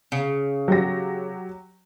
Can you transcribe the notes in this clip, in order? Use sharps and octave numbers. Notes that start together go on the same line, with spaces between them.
C#3
F#3 G4 A#6